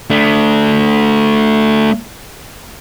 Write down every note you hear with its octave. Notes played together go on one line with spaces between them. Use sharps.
A3 D4